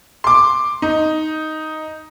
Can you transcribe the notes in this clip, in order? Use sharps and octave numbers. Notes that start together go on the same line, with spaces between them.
C6 D6
D#4